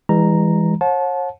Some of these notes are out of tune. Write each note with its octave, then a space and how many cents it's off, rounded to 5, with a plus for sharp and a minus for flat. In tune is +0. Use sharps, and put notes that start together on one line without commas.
E3 +0 G#3 -35 A#5 +0
C#5 -40 F#5 -40 A5 -25